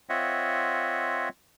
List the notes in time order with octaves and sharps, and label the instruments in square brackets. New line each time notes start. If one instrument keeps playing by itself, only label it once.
[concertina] C4 F4 C#5 D#5 E5 F#5